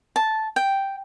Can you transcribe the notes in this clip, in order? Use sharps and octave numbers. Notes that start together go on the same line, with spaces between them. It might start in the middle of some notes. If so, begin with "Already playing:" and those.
A5
G5